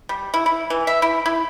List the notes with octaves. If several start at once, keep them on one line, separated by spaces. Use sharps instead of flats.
G3
E4
E4
E3
E5
E4
E4